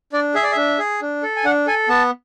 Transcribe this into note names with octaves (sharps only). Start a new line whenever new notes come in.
D4 D5
G#4 E5
D5
D4 E5
G#4
D4
A4
G#5
D4 F#5
A4 G#5
B3 A5